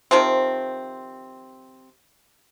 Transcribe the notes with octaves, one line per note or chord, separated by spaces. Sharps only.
C3 D#3 F3 C4